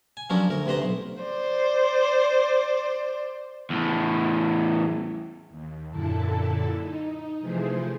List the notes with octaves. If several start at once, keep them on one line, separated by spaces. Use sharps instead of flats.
G#5
F3 F#3 A#3 C#4 D4 F#4
D2 A#4
D2 C3 B4 C5 A#5
B1
C5 D5
E2 A2
D#2
F#2 A#2 D3 E4 A4 A5
D#4
C3 E3 F3 A3 G#4 C5